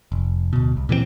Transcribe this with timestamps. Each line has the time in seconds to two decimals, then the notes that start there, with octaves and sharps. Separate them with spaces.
0.12 F1
0.53 D1 B2
0.77 C2
0.89 A#2 E3 F3 C4